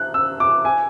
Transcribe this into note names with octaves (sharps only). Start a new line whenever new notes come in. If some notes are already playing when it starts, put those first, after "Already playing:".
Already playing: F#6
E6
D6
G#5